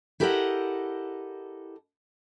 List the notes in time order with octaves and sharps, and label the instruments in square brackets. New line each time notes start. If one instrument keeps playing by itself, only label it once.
[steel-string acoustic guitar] E4 G4 A4 A#4 D#5 F#5